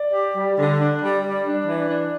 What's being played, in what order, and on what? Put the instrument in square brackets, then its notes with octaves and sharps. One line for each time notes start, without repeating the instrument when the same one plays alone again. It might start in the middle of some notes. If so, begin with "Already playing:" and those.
Already playing: [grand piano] D5
[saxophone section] G4
G3
D3
D4
G3
G3
D4
E3
D4